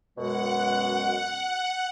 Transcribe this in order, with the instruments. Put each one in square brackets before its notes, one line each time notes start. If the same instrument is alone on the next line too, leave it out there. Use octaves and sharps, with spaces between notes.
[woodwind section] F#2 B2 G#3 [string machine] F#5